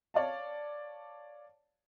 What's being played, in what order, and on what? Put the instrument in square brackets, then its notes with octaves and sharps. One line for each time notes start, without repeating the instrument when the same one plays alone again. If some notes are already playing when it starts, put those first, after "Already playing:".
[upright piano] C#5 D5 F5 A5